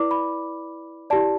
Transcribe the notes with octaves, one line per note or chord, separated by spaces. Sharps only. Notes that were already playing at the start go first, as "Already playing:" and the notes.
Already playing: E4 B4 D5 D6
B5
E4 G4 D5 A5